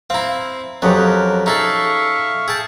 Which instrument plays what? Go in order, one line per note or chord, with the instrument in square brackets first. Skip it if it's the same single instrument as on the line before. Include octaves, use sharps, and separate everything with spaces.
[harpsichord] C4 E4 [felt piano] F5 A#5
[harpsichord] F2 F#3 [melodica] C4 D#4 G#4 [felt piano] C#4 G4 C#5
[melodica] A#4
[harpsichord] D#4 G#4 A4 [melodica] E5 F5 C#6
[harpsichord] G#4 A5 [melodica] G5